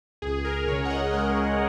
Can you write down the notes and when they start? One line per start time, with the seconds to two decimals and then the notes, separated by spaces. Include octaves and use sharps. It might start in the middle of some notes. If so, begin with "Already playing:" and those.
0.22 C#2 G#4
0.45 A#4
0.67 C#3 G#4 C#5
0.85 F#5
0.90 A#4 D#5
1.13 G#3 A#4 D#5